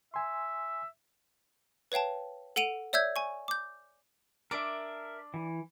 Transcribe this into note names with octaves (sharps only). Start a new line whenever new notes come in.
E5 G#5 C6
B4 C#5 F5 G5 A5
A4 F#5 D7 D#7 F7 F#7
C#5 D5 E5 E6 G6 G#6
G#5 C#6
D6 G6
D4 A#4 E5 D6
E3